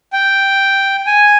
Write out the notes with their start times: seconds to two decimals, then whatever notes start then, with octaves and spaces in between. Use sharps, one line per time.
0.13 G5
1.06 G#5